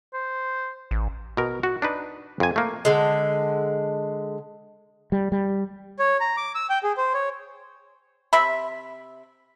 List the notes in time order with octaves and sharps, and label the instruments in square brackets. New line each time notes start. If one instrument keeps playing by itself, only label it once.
[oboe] C5
[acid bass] A1
[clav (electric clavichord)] B2 A#4
F#4
D4 D#4 B4
F2 G#5
A3 A#3
[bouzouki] D3 G#3
[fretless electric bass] G3
G3
[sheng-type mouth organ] C#5
A#5
D6
E6
G5
G#4
C5
C#5
[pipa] C3 E5 B5